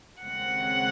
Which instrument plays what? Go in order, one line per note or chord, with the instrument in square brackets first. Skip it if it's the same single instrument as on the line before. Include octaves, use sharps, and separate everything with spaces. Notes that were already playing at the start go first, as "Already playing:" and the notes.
[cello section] D#2 C#3 G#3 C4 [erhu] F#5